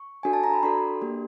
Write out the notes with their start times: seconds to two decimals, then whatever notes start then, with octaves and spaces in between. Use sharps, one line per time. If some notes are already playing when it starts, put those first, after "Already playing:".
Already playing: C#6
0.23 D4 F#4 A4 G#5
0.33 A5
0.44 A#5
0.54 B5
0.63 D4 F#4 A4 C6
1.01 A#3 D4 G4